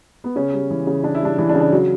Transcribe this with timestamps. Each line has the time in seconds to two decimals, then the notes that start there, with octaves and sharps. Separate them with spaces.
0.24 B3
0.36 C#3 C#4
0.53 G3
0.70 E3
0.87 C#3
1.04 C#3 D4
1.15 E4
1.22 G3 D4
1.38 E3 E4
1.49 D4
1.55 C#3
1.60 D4
1.72 F#3